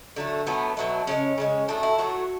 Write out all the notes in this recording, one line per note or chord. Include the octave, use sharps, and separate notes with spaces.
D3 F#3 A3
B2 F#3 A3 B3
B2 F#3 A3
C#3 E3 G#3 C#4
C#3 E3 G#3
A2 F#3 A3 D4
E4
A2 F#3 A3 F#4